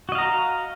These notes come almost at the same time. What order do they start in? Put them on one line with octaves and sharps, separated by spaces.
F#4 D#5 F5 A#5